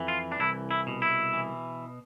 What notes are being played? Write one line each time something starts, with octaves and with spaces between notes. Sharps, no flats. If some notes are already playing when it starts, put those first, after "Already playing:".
Already playing: F2 E3
F4
D4
C2 E4
E4
B2
E4
E3